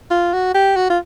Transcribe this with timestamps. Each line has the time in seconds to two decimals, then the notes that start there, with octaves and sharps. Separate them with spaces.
0.10 F4
0.33 F#4
0.54 G4
0.76 F#4
0.90 F4